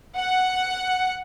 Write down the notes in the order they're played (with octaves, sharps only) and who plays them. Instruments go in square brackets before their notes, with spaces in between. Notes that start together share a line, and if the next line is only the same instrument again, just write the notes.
[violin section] F#5